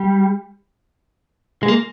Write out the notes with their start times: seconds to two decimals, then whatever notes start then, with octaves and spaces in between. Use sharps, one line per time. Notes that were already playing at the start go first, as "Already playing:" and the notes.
Already playing: G3
1.63 G#3
1.68 A#3